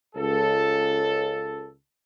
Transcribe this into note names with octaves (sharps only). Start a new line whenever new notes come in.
C#2 A4